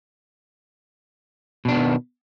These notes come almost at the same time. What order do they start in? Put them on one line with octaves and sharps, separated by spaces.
B2 D4 B3 D#3